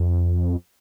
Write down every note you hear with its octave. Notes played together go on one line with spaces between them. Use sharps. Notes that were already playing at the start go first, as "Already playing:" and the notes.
Already playing: F2